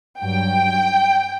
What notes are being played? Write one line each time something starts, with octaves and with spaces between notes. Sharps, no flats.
G2 F#3 G5